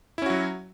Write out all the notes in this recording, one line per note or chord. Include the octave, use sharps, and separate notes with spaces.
F#3 C#4 E4 F#4